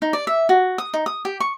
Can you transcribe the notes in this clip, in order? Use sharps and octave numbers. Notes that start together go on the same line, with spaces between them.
D#4
D5
E5
F#4
D#6
D#4
D#6
G4
C#6